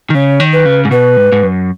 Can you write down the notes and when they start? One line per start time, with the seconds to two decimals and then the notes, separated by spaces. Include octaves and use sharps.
0.10 D#3
0.14 C#3 C#5
0.40 D#3
0.52 B4
0.65 C#3
0.85 G#2
0.91 B2 B4
1.17 G#2
1.32 G#2
1.43 F#2